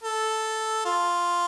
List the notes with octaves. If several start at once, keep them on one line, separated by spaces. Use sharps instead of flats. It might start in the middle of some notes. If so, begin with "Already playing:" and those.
A4
F4